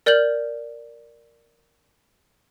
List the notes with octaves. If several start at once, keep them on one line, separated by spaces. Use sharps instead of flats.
A#4 D5 F6 G6 F#7